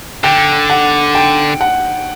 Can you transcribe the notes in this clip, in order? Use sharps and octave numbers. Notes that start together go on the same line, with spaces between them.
D3 G5
F#5
G5
F#5